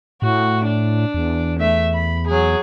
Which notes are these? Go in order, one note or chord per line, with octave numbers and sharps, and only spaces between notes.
A2 F#4
D4
E2
A3 E5
B5
F#3 G#4